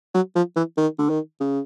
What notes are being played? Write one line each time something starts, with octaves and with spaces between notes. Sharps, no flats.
F#3
F3
E3
D#3
D3
D#3
C#3